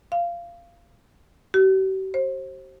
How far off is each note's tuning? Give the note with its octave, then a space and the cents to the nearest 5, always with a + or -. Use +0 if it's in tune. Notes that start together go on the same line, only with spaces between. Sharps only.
F5 -20
G4 -45
C5 +30